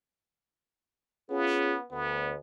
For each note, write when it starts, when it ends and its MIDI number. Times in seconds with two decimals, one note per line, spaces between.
1.29 1.85 59
1.29 1.75 61
1.29 1.75 65
1.29 1.75 68
1.91 2.36 38
1.91 2.34 59